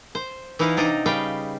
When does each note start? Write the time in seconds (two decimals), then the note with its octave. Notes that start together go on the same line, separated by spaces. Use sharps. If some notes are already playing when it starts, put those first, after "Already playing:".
0.15 C5
0.59 E3 D#4 E4 F5 F#5
0.77 C3 D4 D#4 A#5
1.06 C#3 G3 B4 F5 G5